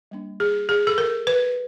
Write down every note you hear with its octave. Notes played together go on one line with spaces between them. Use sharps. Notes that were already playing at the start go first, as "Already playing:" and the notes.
G3 A#3 D4
G#4
G#4
A4
A#4
B4